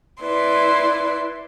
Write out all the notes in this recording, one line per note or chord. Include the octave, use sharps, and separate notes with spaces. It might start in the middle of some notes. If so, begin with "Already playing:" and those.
E4 B4 D5 C6